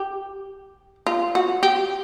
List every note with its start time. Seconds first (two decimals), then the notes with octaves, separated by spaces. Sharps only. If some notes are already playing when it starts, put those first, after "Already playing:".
Already playing: G4
1.07 F4
1.35 F#4
1.63 G4